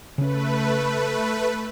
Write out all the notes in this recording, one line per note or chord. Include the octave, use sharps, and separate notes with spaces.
C#3 A3 C#4 B4